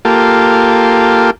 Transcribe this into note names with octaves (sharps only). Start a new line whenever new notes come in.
A#3 F4 G4 A4